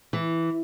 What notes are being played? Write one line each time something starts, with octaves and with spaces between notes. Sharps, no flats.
E3